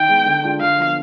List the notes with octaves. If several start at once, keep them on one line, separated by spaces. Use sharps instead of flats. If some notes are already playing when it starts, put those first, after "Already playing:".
Already playing: D#3 G5
G#3 B3
D3
G#3 D4 F4
D3 F5
F3 B3